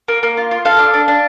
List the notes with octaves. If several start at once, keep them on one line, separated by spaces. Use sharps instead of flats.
A#3
A#3
F4
F4
A4 F5
D4
D4
D4